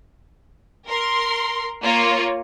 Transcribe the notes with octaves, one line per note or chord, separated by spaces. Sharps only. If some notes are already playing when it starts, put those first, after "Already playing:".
A#4 C6
A#3 F4 C#5